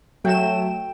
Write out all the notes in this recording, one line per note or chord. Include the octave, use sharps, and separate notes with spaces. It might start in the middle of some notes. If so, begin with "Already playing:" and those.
F#3 A3 G5 E7